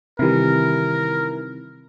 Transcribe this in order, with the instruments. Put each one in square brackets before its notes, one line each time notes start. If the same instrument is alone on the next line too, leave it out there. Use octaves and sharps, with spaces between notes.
[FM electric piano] C3 D#3 [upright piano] E3 G3 E4 [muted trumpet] A#4